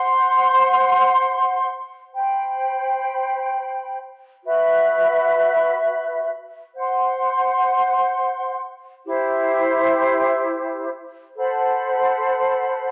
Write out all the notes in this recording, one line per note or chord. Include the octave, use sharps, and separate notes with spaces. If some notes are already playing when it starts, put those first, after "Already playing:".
Already playing: C5 F#5 C6
C5 G5 B5
F#4 B4 E5 B5
C5 F#5 C6
E4 G4 C5
A4 C5 F#5 B5